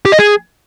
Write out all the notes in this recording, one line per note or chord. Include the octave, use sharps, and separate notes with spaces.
G4
D#5
G#4